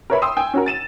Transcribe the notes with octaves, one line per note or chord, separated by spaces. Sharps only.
A#4 B4 C#5 E5 B5
G5 C6 D#6 E6
G5 G#5
C#4 F#4 A#4
A6 D#7 E7